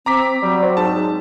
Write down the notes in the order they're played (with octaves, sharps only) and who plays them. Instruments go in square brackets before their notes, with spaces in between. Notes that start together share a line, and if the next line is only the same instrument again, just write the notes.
[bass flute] C4 [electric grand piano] A#5 D6 B6
[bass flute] F#3 [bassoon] G3
[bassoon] C4
[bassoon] G#2 [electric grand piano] A5